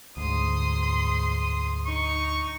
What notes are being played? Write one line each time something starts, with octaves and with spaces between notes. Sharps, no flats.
D2 G#2 C6 D#6
D#4 C#6